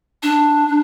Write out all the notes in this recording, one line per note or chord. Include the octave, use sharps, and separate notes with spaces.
D4